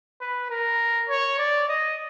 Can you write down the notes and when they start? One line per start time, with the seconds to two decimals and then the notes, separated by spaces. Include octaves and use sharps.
0.21 B4
0.50 A#4
1.09 C#5
1.39 D5
1.68 D#5